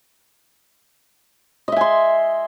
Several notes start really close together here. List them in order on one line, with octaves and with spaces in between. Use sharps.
D#5 E5 G#5 C6